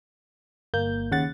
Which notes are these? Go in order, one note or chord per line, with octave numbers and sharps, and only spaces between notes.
G1 A#3 G6
D#2 C#3 F#5 A6